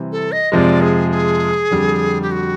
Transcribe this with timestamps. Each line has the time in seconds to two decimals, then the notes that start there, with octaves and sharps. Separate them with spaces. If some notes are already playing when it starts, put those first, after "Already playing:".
Already playing: C3 E3 G3 C4
0.12 A4
0.32 D#5
0.52 F2 C3 F3 G#3 D5 D#5
0.81 G#4
1.11 G#4
1.71 F2 D3 G3
2.23 G4
2.31 F#4